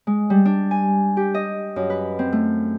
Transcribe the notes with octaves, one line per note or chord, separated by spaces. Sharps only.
G#3
G3
D4
G#5
G4
D#5
F#2
B4
C4
A3